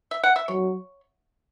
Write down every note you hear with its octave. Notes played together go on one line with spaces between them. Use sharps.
E5
F#5
E5
F#3 C#5